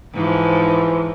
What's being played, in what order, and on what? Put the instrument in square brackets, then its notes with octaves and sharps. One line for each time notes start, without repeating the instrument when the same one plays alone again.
[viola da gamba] G#2 F3 [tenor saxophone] E3